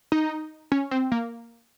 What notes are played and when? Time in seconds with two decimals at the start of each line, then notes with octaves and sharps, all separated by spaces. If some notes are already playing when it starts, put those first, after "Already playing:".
0.12 D#4
0.72 C#4
0.91 C4
1.12 A#3